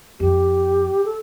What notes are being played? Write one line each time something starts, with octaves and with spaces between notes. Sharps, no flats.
F2 G4
A4